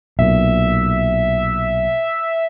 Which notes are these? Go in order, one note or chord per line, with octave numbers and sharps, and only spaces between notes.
B1 A#2 E5